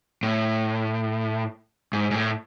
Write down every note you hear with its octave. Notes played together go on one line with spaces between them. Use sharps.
A2
G#2
G#2
A2